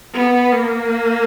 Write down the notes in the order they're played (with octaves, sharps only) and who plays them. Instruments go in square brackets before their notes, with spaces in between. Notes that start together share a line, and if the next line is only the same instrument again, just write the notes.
[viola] B3
A#3